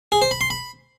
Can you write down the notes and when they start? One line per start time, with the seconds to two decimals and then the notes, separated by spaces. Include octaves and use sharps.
0.12 G#4
0.22 C5
0.31 B5
0.41 C6
0.50 B5